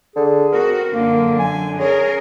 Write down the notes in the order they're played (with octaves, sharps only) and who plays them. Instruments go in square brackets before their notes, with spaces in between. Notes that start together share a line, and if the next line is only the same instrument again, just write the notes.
[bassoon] D3 [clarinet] G#4
[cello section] C4 F#4 [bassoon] A#4
[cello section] F#2 D3 [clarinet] A#3
[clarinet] G#5
[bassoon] C#4 [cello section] G#4 A#4 [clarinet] C#5